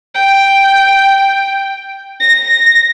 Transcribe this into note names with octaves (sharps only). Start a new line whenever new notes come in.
G5
A#6